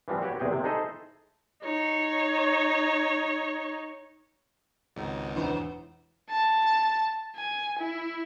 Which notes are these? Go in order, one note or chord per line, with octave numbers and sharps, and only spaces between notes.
E3 F3 G3 C4
F#4 G4 B4 C#5
E2 C3 G#4 G5
C3
D#4 E4 G#4 A4 C5 D#5
D#4 C#5
G#1 C#2 G#2 F#3
E1 E3 F#3 B3 D4 C5
A5
G#5
E4